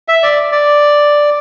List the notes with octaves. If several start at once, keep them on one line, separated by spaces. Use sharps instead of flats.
E5
D5
D5